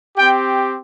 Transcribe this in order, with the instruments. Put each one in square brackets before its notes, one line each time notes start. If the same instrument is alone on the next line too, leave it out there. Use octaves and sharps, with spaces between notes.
[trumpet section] C4 G4 G5